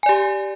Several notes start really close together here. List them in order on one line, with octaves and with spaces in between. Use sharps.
G#5 D5 G4